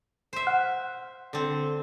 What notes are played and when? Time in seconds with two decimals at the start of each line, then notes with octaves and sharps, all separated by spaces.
0.33 C5 E5
0.47 F#5 F6 F#6
1.33 D3 C4